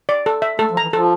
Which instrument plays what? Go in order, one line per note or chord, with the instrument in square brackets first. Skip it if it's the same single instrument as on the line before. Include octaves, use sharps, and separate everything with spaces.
[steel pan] D5
A4
E5
[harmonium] A3 [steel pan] A4
[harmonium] F3
[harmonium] E3 [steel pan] A#5
[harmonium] F3 [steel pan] A4